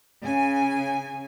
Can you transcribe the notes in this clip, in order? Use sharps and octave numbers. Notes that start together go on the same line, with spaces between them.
C#3 G#5